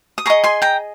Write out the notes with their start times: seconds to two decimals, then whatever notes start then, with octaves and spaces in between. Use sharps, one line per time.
0.18 D#6
0.26 G#4 D#5 A#5 C#6
0.44 G#5 C6
0.62 G5 A#5